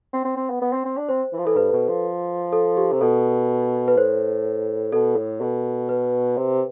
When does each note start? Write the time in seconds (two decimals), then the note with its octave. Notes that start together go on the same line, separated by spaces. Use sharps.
0.13 C4
0.25 C4
0.37 C4
0.50 B3
0.61 B3
0.73 C4
0.85 C4
0.98 D4
1.09 C4 C5
1.33 E3
1.39 F3
1.45 E3 A4
1.57 G2 B4
1.73 B2
1.89 F3
2.53 A4
2.77 G4
2.92 C3
3.01 B2 A4
3.88 B4
3.97 A2 C5
4.92 B2 A4
5.16 A2
5.41 B2
5.89 B4
6.37 C3